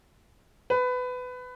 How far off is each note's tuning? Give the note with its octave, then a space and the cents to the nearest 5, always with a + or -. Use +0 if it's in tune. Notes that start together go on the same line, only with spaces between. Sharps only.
B4 +20